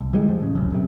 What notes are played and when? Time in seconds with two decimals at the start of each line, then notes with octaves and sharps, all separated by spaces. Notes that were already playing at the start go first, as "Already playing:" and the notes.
0.01 C2
0.13 D3 E3 G3 G#3
0.28 E2 F3
0.40 A1 C#3
0.55 D1 G1 C2 F#2
0.70 D#1 F#2 C3